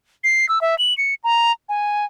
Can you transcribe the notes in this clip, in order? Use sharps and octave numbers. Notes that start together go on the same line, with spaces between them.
C7
E6
E5
F#7
C#7
A#5
G#5